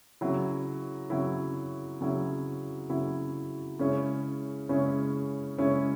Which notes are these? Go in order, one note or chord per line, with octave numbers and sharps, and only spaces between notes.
C#3 F#3 E4
C#3 F#3 E4
C#3 F#3 E4
C#3 F#3 E4
C#3 G#3 C#4 E4
C#3 G#3 C#4 E4
C#3 G#3 C#4 E4